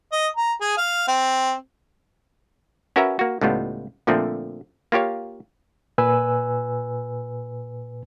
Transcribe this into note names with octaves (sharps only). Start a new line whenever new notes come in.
D#5
A#5
G#4
F5
C4
C#4 F#4 A#4 B4 E5 A#5
A#3 F#4
C#2 A2 G3 B3 F4
A#2 D3 F3 A3 C4
A#3 F4 G4 C#5 F5
A#2 B4 G#5 E6